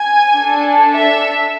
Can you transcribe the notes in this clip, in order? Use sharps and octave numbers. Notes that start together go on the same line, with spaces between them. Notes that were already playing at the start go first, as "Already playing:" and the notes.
Already playing: G#5
D4 A4
E5